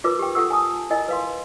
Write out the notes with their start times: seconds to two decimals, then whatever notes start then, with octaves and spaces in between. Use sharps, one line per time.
0.04 D#4 F4 A#4 B4 D6
0.19 G4 G5
0.35 F4 A4 F#5 C#6 E6
0.50 G#5 A5 D#6
0.90 E4 A#4 D#5 G#5
1.08 B4 F5 C6